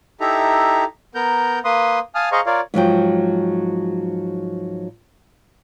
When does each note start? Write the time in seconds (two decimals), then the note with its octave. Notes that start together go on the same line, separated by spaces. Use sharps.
0.20 D#4 E4 G4 A4 E5 A#5
1.15 B3 A#4 A#5 G6
1.64 A#3 B4 C6 D#6
2.15 F5 G#5 A5 D#6 F6
2.32 G#4 C5 D#5 F5 A#5 C#6
2.46 F4 A#4 C#5 D5 F5
2.74 G#2 F3 F#3 G5